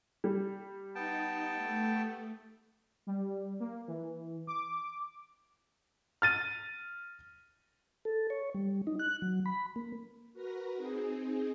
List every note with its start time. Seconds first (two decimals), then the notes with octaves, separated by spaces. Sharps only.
0.24 G3
0.95 B3 D#4 G5 A5
1.56 A3
3.07 G3
3.60 A#3
3.88 E3
4.47 D6
6.22 F6 A6 D#7
8.05 A4
8.30 C#5
8.54 G3
8.87 D#4
9.00 F#6
9.22 F#3
9.46 B5
9.76 A#3
10.33 F#4 A#4 B4 A#5
10.77 C4 D#4 G#4